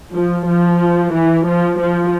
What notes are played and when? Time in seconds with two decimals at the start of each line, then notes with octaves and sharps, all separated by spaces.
0.14 F3
0.47 F3
1.13 E3
1.46 F3
1.79 F3